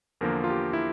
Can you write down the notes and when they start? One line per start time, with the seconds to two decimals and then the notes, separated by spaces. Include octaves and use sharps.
0.21 E2 D3 F3 A#3 A#4
0.44 F4
0.50 G4
0.73 E4